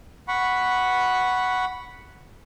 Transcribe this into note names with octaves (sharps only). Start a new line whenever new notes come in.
F#5 B5 C#6